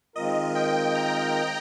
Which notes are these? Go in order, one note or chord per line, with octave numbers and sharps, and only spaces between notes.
D#3 G#3 C4 F4 A#4 D#5
G5
A#5